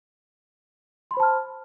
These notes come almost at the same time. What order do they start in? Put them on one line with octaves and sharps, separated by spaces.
C6 B5 C5 A5 F6